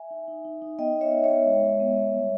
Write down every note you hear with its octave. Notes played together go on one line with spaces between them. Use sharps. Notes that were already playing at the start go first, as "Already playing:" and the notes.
Already playing: E5 G#5
D#4
D#4
D#4
D#4
B3 D#5 G5
B3
C#5 E5
D#4
C#5 E5
B3
G#3
G#3
B3
B3
G3